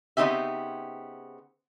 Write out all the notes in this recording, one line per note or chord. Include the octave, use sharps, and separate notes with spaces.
C#3 B3 C4 D#4 G4 E5